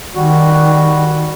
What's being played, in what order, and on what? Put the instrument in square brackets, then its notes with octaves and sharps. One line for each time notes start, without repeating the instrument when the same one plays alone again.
[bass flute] D#3 [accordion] G3 F#4